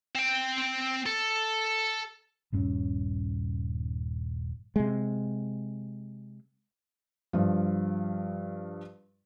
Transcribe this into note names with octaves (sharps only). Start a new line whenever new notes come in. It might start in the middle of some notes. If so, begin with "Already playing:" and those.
C4 G5
A4
D#1 G2 C#4
C3 G#3
G2 F3